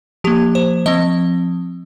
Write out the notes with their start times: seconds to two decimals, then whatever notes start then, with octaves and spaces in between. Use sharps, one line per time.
0.24 F3 A#3 G4
0.55 C5
0.86 F3 C4 D#5